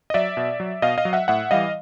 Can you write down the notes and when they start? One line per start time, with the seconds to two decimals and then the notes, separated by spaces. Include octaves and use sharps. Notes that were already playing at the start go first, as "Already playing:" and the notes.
0.10 D#5
0.14 F#3 D5 E5
0.37 B2
0.60 F#3
0.82 B2 D#5 F5
0.98 D#5 F5
1.05 F#3
1.13 E5 F#5
1.28 A2 E5 F#5
1.51 E3 G3 D#5 F5